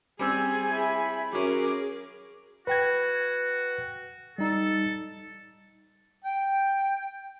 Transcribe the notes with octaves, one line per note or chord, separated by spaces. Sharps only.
G3 C4 G#4 G#5 E6
E4 B5
F#3 C#4 G#4 A#4 D6
F#4 B4 G5 G#6
G3 D#4 A4
G5